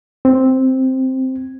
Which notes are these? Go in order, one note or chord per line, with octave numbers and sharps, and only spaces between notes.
C4